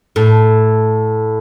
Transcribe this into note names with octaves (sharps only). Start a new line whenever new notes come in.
A2